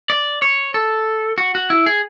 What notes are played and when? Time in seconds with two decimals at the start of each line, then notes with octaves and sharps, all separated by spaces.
0.10 D5
0.42 C#5
0.74 A4
1.38 F#4
1.55 F#4
1.70 E4
1.86 G#4